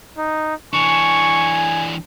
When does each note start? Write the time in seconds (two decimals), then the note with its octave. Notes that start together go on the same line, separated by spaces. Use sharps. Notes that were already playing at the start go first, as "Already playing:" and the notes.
0.18 D#4
0.73 E3 D4 G#5 C#6